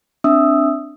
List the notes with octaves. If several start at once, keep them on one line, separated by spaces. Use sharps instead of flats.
C4 D4 E5 D#6 E6